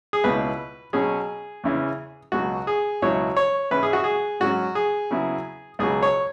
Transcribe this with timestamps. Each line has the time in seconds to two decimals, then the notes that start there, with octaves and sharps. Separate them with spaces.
0.13 G#4
0.24 C#2 B2 B3 E4 B4
0.93 B2 F#3 C#4 G#4
1.64 E2 C#3 E3 C#4
2.32 C#2 B2 F#3 F#4
2.67 G#4
3.02 C#2 B2 F#3 E4 C#5
3.37 C#5
3.71 G#2 E3 G#3 C#4 E4 B4
3.83 G#4
3.93 F#4
4.04 G#4
4.40 G#2 F#3 C#4 F#4
4.75 G#4
5.11 C#3 F#3 B3 E4
5.79 C#2 B2 F#3 G#4
6.02 C#5